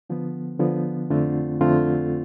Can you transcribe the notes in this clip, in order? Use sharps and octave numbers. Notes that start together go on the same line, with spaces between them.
D3 F3 B3
D3 F3 B3
F2 D3 A3 C4 F4
F2 D3 A3 C4 F4